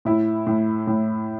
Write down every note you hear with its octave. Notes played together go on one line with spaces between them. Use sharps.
A2 E4
A2
A2